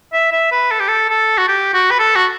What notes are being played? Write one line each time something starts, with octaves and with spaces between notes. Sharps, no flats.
E5
E5
B4
A4
G4
A4
A4
F#4
G4
F#4
B4
A4
F#4